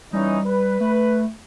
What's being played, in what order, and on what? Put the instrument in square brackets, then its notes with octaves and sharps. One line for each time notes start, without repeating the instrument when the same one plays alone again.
[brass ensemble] E3 C#4 D#4 [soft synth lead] G3
[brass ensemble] B4
[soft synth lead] A3